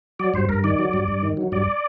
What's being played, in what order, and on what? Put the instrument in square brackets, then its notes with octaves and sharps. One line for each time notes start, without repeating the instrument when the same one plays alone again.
[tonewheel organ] F#3 D5
G2 C5
G2 A#4
D#3 D5
F#3
G2
G2
D#3
F#3
G2 D5